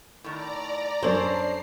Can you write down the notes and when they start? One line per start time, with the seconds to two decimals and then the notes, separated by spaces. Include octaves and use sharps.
0.24 A2 D#3 D5 A#5
1.03 F#2 D4 A4 C5 C#5 C7 F#7